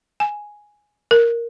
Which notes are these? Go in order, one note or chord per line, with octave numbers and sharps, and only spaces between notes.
G#5
A#4